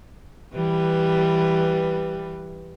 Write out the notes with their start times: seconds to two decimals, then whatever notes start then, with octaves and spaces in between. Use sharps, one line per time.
0.54 E3 G3 B4